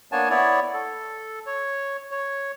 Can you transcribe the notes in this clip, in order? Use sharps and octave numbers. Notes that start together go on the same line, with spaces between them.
A#3 B3 D4 C#5 G#5 A5
B3 E4 C#5 D5
A4
C#5
C#5